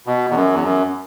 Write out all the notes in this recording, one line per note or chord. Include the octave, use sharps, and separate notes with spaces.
B2
E2
F#2
E2
F#2